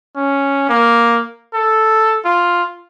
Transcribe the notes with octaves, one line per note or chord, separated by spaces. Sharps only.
C#4
A#3
A4
F4